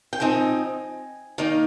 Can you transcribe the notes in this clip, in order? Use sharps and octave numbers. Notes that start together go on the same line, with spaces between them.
G5
F3 C4 D#4 G#5
D#3 A#3 D#4